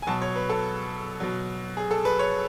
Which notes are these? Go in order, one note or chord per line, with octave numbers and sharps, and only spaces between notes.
G#5
B2 F#3 A5
C#5
B4
A4
B2 F#3
G#4
A4
B4
C#5